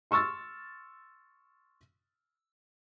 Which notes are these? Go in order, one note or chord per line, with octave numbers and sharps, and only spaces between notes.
C6 C#6 E6 F6 A6